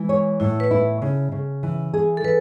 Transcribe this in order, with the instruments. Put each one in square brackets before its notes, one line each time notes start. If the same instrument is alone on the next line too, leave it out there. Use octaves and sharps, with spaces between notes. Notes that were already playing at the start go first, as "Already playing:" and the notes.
Already playing: [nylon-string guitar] E3 [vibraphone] G#3
[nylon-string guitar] C#5
[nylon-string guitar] A2 [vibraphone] E4
[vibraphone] B4
[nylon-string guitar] E4
C#3
C#3
E3
G#4
[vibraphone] A4
[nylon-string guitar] E3 [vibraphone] B4